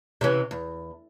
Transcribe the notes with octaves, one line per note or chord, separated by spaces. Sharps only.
C3 E3 C#4
E2